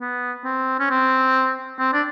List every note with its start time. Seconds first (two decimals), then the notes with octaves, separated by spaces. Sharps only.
0.01 B3
0.44 C4
0.80 C#4
0.90 C4
1.79 C4
1.93 D4